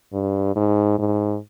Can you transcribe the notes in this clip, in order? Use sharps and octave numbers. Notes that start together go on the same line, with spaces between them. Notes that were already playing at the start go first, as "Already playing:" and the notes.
G2
G#2
G#2